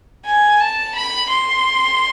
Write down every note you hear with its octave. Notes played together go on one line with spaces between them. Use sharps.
G#5
A5
B5
C6